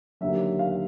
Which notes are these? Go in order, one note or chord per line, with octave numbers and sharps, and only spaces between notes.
D#2 D3 F#3 E5
F5